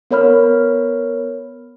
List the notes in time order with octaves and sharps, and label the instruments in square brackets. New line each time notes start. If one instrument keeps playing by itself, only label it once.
[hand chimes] B3 A#4 C#5 B5 F6